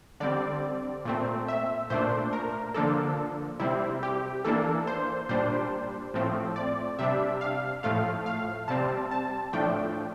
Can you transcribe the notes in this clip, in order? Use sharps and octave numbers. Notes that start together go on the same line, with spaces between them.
D3 G3 C4 D5
A#2 A3 C4
E5
A#2 A3 D4 C5
A#4
D3 F3 A#3 D4 A4
C3 G3 C4 E4
G4
E3 A#3 D4 A4
C5
A#2 G3 D4 C5
A2 F3 A3 C4
D5
C3 G3 D4 E5
F5
A2 F3 A3 F5
F5
C3 G3 C4 A5
A5
A2 F3 A3 D4 G5